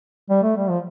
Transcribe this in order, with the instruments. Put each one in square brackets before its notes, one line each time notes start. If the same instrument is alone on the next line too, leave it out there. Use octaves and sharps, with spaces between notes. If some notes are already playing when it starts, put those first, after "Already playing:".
[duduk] G3
A3
G3
F3